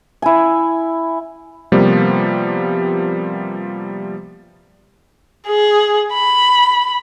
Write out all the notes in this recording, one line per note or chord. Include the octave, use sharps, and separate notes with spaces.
E4 G#5
C3 F3 G3 A#3 B3
G#4
B5